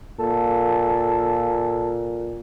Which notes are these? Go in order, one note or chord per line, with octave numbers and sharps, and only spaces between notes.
A#2 A4